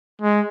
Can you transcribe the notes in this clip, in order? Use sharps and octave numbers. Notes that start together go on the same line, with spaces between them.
G#3